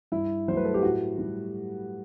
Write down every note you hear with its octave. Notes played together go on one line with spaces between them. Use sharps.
G2 E4
F#3 A3 B4 C5
A4
G4
A2 F#4
G3